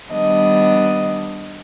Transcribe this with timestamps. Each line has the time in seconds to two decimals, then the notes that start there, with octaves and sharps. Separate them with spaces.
0.12 D#3 G3 B3 D4 D#5